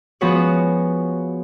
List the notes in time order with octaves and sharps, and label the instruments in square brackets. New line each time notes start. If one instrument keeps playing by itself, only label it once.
[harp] F3 B3 F#4 G#4 B4 C#5